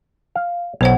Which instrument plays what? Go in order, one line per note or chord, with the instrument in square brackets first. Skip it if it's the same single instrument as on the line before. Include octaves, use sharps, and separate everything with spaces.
[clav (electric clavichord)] F5
[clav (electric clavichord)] B1 [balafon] B3 C5 F#5